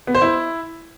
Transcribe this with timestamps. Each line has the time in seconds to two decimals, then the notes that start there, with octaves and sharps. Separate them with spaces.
0.07 B3
0.15 C5
0.22 E4